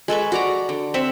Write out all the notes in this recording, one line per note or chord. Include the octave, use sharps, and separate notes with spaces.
G#3 A4 B4 C#6
F#4 D5 A#5
D3
C4 E5 F#5